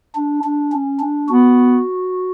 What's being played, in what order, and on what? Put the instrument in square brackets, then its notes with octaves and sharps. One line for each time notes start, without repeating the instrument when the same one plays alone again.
[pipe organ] D4
D4
C#4
D4
[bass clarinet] B3 [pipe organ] F#4